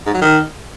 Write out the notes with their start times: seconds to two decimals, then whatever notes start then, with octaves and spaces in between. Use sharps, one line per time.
0.06 G#2
0.14 F#3
0.21 D#3